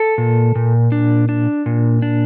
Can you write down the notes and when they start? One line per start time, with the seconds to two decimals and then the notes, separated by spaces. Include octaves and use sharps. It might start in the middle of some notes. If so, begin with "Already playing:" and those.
Already playing: A4
0.18 A#2
0.55 A#2
0.92 D4
1.29 D4
1.66 A#2
2.02 D4